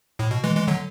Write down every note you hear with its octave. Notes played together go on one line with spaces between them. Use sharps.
A2
B2
E3 G#3
E3 G#3
D3 F#3